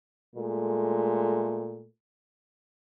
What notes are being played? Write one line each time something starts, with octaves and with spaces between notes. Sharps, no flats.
A#2 G#3 A3